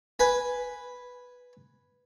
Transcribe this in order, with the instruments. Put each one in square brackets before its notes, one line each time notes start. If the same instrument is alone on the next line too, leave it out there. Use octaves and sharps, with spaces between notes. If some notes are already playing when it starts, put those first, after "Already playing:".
[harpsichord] B4 G#5